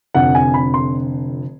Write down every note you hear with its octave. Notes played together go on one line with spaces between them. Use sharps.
F1 F2 D3 F#5
G#5
B5
C6